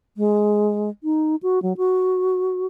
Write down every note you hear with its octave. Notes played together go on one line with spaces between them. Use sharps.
G#3
D#4
F#4
F#3
F#4